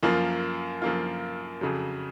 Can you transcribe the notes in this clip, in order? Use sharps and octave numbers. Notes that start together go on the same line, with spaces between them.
F#2 F3 A#3 F4
F#2 F3 A#3 F4
F2 C#3 F#3